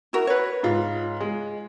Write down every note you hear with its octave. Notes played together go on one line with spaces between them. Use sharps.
E4 F#4 A#4
B4 C#5
G#2 F4
G#3